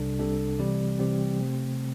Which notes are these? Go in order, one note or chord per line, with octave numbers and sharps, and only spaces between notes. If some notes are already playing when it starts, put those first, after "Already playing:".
Already playing: C2 C3 G3 D4 A4
C2 C3 G3 D4 A4
C3 E3 G3 C4 G4
C3 E3 G3 C4 G4
C3 A3 C4